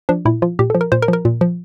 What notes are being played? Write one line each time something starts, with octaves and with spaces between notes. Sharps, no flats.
F3 D4
A#2 E4
F3 F4
A#2 G4
F3 A4
A#4
A#2 C5
A#4
F3
A#4
A#2
F3